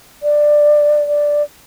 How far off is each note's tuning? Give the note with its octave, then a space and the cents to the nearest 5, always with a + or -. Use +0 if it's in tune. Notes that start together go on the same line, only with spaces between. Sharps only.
D5 +10
D5 +0